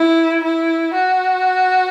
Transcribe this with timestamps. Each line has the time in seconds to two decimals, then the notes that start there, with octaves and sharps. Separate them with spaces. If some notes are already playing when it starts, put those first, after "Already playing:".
Already playing: E4
0.44 E4
0.94 F#4